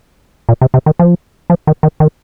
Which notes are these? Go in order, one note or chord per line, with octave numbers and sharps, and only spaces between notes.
A#2
C3
C3
D#3
F3
F3
D#3
D#3
D#3